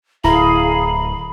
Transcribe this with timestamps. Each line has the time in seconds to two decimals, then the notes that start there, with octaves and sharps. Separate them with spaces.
0.24 D1 E4 G#4 F5 A#5 B5